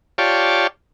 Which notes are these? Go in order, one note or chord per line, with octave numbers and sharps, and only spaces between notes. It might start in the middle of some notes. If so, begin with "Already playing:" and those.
F4 G4 C#5 D5 A5